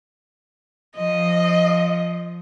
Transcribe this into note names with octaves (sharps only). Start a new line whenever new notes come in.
F3 D#5